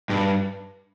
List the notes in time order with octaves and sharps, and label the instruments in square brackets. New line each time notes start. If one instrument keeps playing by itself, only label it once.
[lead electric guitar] G2